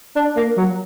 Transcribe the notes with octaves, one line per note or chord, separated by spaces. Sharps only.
D4
A#3
F#3